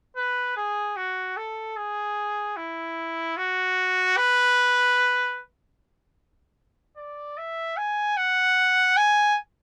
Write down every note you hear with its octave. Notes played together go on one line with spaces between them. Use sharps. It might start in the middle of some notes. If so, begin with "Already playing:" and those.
B4
G#4
F#4
A4
G#4
E4
F#4
B4
D5
E5
G#5
F#5
G#5